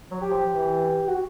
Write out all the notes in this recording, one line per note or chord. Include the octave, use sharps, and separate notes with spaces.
F#3
G4
F3
E3
G4
F#4